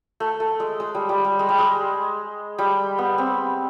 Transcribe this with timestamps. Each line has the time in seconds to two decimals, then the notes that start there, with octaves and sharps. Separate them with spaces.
0.20 A3
0.40 A3
0.60 G#3
0.80 G#3
0.95 G3
1.09 G3
1.24 G3
1.39 G#3
1.49 G3
1.58 G#3
2.58 G3
2.98 B3
3.18 C4